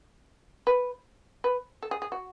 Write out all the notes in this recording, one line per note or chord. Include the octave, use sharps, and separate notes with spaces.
B4
B4
A4
G#4
G#4
F#4